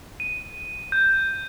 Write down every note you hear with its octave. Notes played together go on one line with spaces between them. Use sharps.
D#7
G6